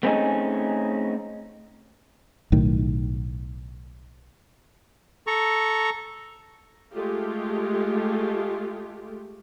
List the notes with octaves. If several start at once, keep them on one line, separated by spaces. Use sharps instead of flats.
A3 C4 C#4 D#4 G#4
B1 A2 D#3
A4 A#5 C#6
G#3 A3 F4 G4